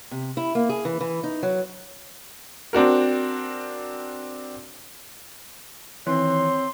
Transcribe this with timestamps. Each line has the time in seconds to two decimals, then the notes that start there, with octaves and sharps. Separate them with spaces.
0.11 C3
0.37 E4
0.55 A#3
0.69 G#4
0.85 E3
1.01 E3
1.24 D#4
1.43 F#3
2.73 C4 D4 F#4 A#4
6.07 D#3 E3 C4 C#5 C6 F#6